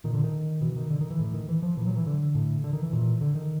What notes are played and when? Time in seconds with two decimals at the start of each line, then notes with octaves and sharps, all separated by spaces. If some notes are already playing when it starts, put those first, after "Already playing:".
0.04 A#2 D#3
0.14 D3
0.24 D#3
0.61 B2 E3
0.76 D#3
0.90 D3
1.01 D#3
1.10 E3
1.19 A2
1.34 D#3
1.49 E3
1.63 F3
1.77 A#2 E3
1.87 F#3
1.97 E3
2.06 D3
2.35 A2
2.64 D3
2.73 D#3
2.83 E3
2.93 A#2
3.21 D3
3.35 D#3